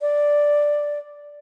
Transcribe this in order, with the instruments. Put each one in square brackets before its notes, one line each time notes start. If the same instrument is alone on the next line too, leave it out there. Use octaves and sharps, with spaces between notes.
[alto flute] D5